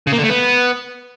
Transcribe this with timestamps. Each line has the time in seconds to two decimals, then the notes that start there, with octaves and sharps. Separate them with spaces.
0.07 C#3
0.13 A#3
0.18 D3
0.24 A3
0.29 B3